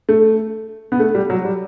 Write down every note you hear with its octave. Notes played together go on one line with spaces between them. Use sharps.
A3
B3
A3
G3
F#3
G3